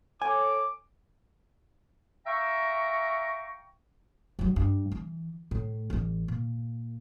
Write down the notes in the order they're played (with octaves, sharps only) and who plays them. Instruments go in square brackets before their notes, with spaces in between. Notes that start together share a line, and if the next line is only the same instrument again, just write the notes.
[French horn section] A4 C#5 [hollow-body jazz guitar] G#5 [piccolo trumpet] D6
[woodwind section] E5 F5 G5 A#5 C#6
[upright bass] G2 F#3
G2
E3
A2
A1 E3
A#2